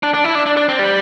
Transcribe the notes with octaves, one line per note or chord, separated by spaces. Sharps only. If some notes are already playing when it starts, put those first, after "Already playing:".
D4
D4
E4
D4
D4
D4
C4
G3